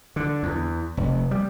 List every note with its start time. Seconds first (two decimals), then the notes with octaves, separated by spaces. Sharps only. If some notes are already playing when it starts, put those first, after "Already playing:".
0.16 D3
0.43 E2
0.97 F1
1.31 G3